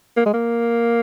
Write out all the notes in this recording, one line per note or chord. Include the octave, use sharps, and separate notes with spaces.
A#3
G#3
A#3